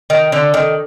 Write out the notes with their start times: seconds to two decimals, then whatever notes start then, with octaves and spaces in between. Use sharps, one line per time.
0.10 D#3
0.32 D3
0.54 D#3